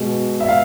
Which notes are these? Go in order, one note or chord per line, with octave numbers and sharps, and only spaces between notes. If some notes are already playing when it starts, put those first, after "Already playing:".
Already playing: B2 G#3
E5
F5